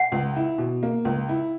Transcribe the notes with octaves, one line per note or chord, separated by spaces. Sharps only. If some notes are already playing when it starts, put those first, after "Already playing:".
Already playing: F#5
C#2
E4
B2
A#3
C#2
E4